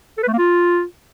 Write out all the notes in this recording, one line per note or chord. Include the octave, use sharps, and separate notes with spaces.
A4
B4
A3
A#3
F4